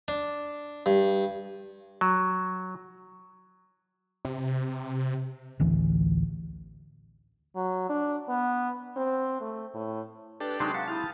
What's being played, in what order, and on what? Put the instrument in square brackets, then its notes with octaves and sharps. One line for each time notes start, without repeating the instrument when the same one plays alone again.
[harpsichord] D4
G2
[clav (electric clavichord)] F#3
[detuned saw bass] C3
[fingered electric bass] A1 D2 E3
[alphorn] F#3
D4
B3
C4
A3
A2
[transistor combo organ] D4 G4 A4 [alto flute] B4
[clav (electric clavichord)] C3 F#3 G#3 [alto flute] D#4 [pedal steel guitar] G#4 C5
[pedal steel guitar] G4 F#5 [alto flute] F5 [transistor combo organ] A5
[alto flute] E4 [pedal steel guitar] F5 G5 D#6